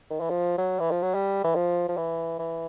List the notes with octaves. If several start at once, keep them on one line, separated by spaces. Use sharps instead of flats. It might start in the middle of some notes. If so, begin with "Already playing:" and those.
D#3
E3
F3
F#3
E3
F3
F#3
G3
E3
F3
F3
E3
E3